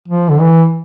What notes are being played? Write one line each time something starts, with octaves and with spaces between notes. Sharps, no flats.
F3
D3
E3